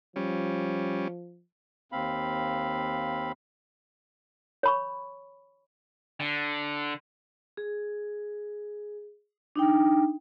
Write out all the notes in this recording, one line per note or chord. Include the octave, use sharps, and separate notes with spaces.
F3 G3 C#4
D#2 C4 F5 B5
C#5 B5 C#6
D3
G#4
D4 D#4 G5